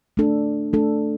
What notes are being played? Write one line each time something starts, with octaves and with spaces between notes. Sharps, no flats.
A3 D4 A4
A3 D4 A4